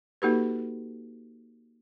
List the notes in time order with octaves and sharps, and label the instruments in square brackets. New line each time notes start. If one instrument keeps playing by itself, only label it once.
[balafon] A#3 D#4 F#4 G4 A4 B4